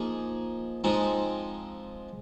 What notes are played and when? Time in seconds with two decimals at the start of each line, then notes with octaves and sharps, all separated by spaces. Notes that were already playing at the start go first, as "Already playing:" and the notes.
Already playing: F3 A#3 D#4 G#4
0.84 F3 G#3 C4 D#4